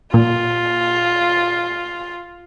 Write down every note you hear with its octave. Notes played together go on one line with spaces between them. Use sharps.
A#2 F4